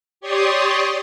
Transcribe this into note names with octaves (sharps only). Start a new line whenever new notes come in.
G4 C#5 D5 C6 C#6 D#6